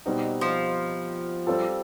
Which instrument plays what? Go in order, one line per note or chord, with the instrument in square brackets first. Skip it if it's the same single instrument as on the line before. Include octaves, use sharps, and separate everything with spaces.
[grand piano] B2 G3 C4 D#4
[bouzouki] F3
[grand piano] G3 C4 F4 A4